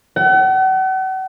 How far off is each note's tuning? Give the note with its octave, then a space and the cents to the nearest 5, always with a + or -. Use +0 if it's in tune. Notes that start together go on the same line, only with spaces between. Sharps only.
F#5 +40